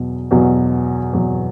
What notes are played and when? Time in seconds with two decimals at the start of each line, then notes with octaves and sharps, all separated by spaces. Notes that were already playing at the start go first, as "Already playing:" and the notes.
Already playing: E2 B2 F#3
0.31 E2 B2 F#3
1.13 E2 B2 F#3